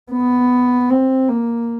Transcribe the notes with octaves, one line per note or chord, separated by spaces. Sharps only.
B3
C4
A#3